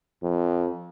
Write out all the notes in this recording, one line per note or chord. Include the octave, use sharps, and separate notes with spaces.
F2